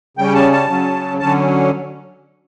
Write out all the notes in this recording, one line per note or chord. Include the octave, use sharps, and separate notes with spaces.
C#3 G3 C#4 G5
A5
A5
C#3 F#3 C#4
D3 F#3 C#4 A5